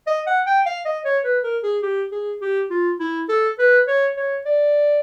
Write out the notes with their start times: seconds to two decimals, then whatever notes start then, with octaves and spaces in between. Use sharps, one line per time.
0.07 D#5
0.27 F#5
0.46 G5
0.66 F5
0.85 D#5
1.05 C#5
1.24 B4
1.44 A#4
1.63 G#4
1.82 G4
2.12 G#4
2.41 G4
2.70 F4
3.00 E4
3.29 A4
3.59 B4
3.87 C#5
4.17 C#5
4.46 D5